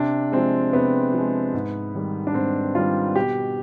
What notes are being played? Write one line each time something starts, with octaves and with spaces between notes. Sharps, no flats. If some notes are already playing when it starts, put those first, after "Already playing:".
Already playing: C3 D4
F3 G#3 C4
C3 B3
F3 G#3
G#2
D#3 G3
D4
G#2 C4
D#3 G3 F4
B2 G4